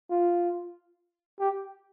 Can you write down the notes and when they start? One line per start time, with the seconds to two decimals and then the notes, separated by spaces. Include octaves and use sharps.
0.10 F4
1.39 G4